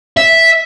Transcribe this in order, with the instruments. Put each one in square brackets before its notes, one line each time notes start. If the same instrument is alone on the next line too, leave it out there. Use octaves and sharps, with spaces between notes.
[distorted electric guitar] E5